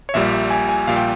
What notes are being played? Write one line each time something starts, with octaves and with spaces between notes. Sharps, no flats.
C#5
A#1 A#2 G3 E5
E5
G#5
G#5
A#1 A#2 G3 F5
G5